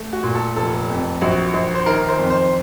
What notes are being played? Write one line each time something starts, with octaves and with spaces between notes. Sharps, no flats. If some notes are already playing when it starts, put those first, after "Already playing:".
Already playing: A3
F#4
A#2
A4
F1 A4
F2
A#1 F#4
A#1
C5
D#3 A#4
C5
F2
C5